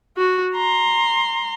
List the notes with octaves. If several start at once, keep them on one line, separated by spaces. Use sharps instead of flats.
F#4
A#5 C6